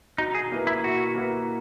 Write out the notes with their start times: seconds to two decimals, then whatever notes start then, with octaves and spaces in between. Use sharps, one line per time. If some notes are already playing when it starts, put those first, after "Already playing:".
0.18 B2 D#4
0.35 G#4
0.51 A#3 E4 B4
0.67 E4
0.84 B2 F#4
1.15 A#3 E4 B4